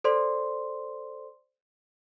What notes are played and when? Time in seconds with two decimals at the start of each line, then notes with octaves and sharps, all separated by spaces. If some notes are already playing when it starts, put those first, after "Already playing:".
0.04 A4 C5 D5 C6